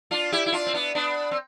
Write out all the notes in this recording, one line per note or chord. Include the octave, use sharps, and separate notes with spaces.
D4 F4
E4 G4
E4
D4 F4
C4
B3 D4
B3 D4
C4